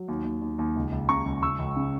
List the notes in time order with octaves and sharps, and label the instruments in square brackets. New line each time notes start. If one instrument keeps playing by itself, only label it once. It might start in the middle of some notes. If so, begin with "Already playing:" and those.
Already playing: [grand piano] F#3
D#2
D#2
D#2
D#2
C#2
C#2
C#3 A#5 C#6
C#2
C#2 C#6 E6
C#2
C#3